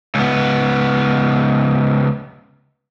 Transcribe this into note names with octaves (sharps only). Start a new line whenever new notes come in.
C#2 B3